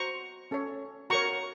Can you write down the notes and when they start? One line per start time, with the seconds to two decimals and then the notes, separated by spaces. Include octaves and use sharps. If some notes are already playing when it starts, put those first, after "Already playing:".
Already playing: F#4 C5 A#5 C#6
0.51 C#4 A4 C#5
1.10 F#4 A#4 C#5 A#5 C#6